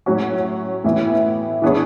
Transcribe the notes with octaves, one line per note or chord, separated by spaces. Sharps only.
A2 F#3 C#4 F#4
A2 E3 B3 E4
E3 B3 D4 G#4 C#5